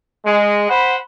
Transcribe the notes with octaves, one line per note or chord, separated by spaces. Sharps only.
G#3
C5 F#5 B5